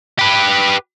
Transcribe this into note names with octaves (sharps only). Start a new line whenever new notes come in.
G4 B4